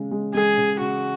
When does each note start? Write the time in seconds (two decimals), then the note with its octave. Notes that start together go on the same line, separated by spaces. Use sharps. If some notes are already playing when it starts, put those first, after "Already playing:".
Already playing: C#3 G#3
0.11 G#3
0.34 G#3 G#4
0.57 C#3
0.80 C#3 F#4